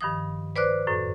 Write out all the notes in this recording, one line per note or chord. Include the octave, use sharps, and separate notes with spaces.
G2 D#3 F3 D#6
B4 C5 D5 D6 F6 F#6
F#2 A2